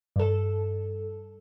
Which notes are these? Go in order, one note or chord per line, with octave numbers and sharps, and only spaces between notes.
G2 A4